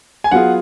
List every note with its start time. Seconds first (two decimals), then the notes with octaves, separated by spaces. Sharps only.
0.24 G#5
0.31 F#3 B3 F4 G#4 F#5